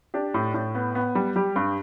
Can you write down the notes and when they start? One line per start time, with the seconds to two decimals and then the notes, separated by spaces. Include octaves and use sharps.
0.14 D4 G4
0.34 A2
0.54 A2
0.75 B3
0.95 B3
1.15 G3
1.36 G3 G4
1.56 G2